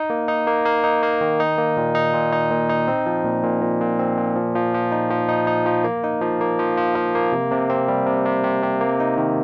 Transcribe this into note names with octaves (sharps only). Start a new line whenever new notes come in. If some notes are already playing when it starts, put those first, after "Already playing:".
Already playing: D#4
A#3
D#4
A#3
A#3
D#4
A#3
D#3
D#4
A#3
A#2
D#4
A#2
D#4
A#2
D#4
C4
F3
A#2
A#2
A#2
A#2
C4
A#2
F3
F3
F3
D#4
F3
D#4
D#4
F3
A#3
D#4
F3
A#3
F3
F3
F3
A#3
C3
C3
C4
G3
C3
C3
C3
C3
A#3
D#4
D#3